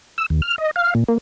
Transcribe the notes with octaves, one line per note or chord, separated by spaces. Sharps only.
E6
D#2
F6
D#5
F5
A#2
A#3